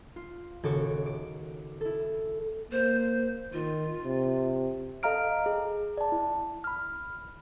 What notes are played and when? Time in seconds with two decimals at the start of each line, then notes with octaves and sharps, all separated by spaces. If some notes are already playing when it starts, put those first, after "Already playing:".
0.16 F4
0.63 D#1 C#3 F#4 A4 C#6 D6
1.06 D6 D7
1.81 E4 A4
2.72 A#3 C5
3.53 D#3 F4
4.04 C3
5.03 A4 D#5 F5 A#5 F6 D7
5.46 G#4
5.97 D5 A5
6.12 E4
6.64 B5 F6